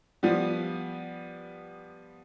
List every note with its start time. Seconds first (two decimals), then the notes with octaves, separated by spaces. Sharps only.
0.23 F3 G3 B3